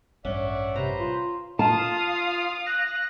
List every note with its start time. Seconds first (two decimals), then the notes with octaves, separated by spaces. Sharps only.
0.25 A1 G2 C#4 D5 E5 F#5
0.76 C3 B4 C5 A#5
1.00 F4
1.59 F4 F5 A5 D#6
2.66 F#6 A#6